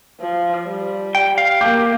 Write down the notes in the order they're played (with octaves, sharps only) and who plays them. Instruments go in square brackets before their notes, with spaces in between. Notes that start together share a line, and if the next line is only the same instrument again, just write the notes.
[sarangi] F3
G3
[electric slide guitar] G5
F5
[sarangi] A#3 [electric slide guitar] G4